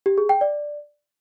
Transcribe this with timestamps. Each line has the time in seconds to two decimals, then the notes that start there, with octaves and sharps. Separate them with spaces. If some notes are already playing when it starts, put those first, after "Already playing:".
0.06 G4
0.18 G#4
0.29 G5
0.41 D5